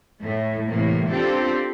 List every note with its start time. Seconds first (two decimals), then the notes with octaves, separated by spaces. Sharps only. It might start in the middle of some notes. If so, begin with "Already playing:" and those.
0.22 A2 A3
0.68 A2 C3 E3 A#3
1.10 C4 D4 F4 G4 A4